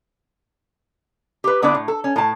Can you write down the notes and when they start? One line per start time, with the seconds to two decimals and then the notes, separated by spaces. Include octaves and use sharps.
1.44 G4 B4
1.62 D3 B3 D4 E4 D5
1.75 A2
1.88 A4
2.04 C#4
2.16 A2 A5